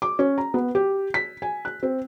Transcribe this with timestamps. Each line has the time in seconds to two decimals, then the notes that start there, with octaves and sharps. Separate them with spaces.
0.02 D6
0.19 C#4
0.38 A#5
0.54 B3
0.75 G4
1.14 B6
1.42 G#5
1.65 F#6
1.83 C4